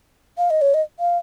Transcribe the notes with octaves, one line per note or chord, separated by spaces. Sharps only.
F5
D#5
C#5
D#5
F5